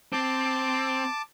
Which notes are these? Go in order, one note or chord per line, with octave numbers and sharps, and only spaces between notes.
C4 A5 D6